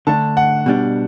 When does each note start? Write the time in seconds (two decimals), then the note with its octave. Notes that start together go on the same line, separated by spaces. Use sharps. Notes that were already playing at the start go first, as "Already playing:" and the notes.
0.07 D3 A3 D4 A5
0.37 F#5
0.66 B2 G3 D4